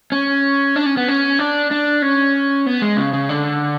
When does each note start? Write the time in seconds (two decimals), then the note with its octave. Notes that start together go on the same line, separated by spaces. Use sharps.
0.12 C#4
0.76 D4
0.86 C#4
0.97 B3
1.08 C#4
1.39 D4
1.71 D4
2.02 C#4
2.66 B3
2.82 G#3
2.97 C#3
3.13 C#3
3.29 D3